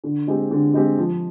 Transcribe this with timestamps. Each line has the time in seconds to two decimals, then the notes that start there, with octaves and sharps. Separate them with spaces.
0.04 D3
0.27 G#3 C4 G4
0.51 D3
0.74 G#3 C4 G4
0.98 F3